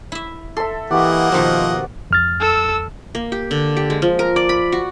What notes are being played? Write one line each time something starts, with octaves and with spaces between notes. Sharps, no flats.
E4 E5
A4 E5 C6
E3 A#3 F#4 G4 D#5 F#5
B2 D#3 F3 C4
F2 F6 A6
A4 E6
A#3
G4
D3
G4
G#3
F3
A#4
D5
B5
F#4